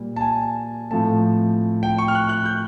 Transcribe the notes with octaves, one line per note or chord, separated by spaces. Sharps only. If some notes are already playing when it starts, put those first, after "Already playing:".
Already playing: A#2 G3
A5
G#5
A2 F3 A3 C4 A5
G5
C#6
F6
F#6
F#6
G6